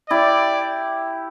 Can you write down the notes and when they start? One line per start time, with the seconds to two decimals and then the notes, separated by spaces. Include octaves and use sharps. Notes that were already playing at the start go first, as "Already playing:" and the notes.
0.10 E4 G4 D5